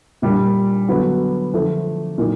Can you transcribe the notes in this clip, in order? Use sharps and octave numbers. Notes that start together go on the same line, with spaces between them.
A#2 G3 A#3 D4
D3 F#3 B3
D3 F3 A3
A#2 F#3 A#3 D#4